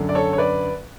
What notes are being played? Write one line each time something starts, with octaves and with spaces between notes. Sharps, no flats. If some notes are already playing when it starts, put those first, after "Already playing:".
Already playing: F#2 D3
D5
A4 C#5
C#5
B4 D5